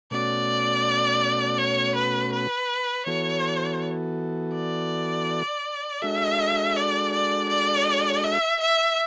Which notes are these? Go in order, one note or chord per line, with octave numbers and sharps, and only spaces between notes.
B2 A3 C#4 F#4 D5
C#5
B4
B4
E3 B3 F#4 A4 C#5
D5
G#3 D4 F#4 A4 E5
D5
D5
D5
E5
E5